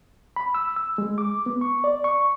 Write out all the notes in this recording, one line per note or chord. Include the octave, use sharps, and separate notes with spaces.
B5
E6
E6
G#3
D6
B3
C#6
D5
C#6